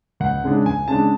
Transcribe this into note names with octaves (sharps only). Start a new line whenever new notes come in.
C#2 F#5
C#3 G#3 D4
C#2 G#5
C#3 G#3 D4 A5